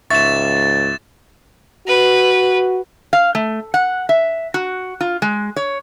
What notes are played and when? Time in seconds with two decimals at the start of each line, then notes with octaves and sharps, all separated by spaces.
0.11 C#2 G#2 E5 C#6 A6 E7
1.87 F#4 B4
3.13 F5
3.35 A3
3.74 F#5
4.09 E5
4.54 F#4
5.01 F4
5.22 G#3
5.56 C#5